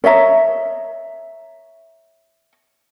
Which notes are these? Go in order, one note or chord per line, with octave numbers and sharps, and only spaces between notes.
C#5 D#5 E5 A#5